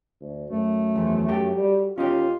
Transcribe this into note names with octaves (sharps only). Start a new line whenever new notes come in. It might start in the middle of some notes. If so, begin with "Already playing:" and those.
D2
F#2 A3
E2 F3
F#4 G4 A4
G3
D#2 C#4 D#4 F4 G4